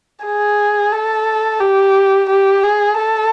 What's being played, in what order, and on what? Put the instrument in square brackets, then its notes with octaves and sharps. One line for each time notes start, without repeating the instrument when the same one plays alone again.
[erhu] G#4
A4
G4
G4
G#4
A4